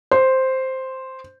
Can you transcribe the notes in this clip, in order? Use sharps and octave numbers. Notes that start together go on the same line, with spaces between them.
C5